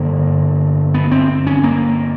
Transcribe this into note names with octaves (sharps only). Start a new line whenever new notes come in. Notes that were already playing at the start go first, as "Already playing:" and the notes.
Already playing: G2 D3 A#3
B3
C4
C#4
A#3